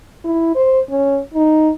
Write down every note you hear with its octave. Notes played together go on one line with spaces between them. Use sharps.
E4
C5
C#4
D#4